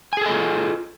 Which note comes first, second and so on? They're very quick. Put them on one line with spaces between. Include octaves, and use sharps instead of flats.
G#5 G#4 A4 D#5 F4